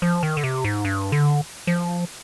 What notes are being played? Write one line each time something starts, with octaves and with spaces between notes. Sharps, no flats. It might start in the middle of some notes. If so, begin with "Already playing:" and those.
F3
D#3
D3
C3
G#2
G2
D3
F3